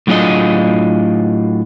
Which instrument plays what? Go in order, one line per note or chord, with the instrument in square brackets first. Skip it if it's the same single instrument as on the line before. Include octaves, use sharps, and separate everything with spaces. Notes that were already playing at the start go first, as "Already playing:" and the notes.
[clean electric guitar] A2 F#3 D4 F4 G#4 D#5